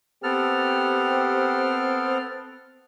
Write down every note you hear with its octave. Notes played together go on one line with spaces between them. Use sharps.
B3 C4 G4 A4 F6